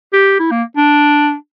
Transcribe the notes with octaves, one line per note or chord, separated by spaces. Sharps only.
G4
E4
A#3
D4